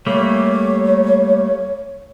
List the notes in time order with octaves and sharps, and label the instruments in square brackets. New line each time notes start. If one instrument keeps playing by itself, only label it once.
[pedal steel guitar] G3 A3 A#3 [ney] C#5